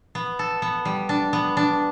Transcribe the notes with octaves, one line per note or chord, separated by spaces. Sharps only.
B3
A4
B3
G3
D4
B3
D4